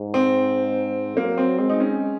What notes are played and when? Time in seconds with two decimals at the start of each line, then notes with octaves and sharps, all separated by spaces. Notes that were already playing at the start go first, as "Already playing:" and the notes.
Already playing: G#2
0.14 C4
1.17 F#3 A#3
1.38 C4
1.58 G#3 C4
1.69 D#4
1.80 C#4